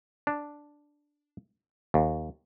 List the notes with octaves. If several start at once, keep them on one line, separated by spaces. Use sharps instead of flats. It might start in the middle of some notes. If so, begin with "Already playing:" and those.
D4
D#2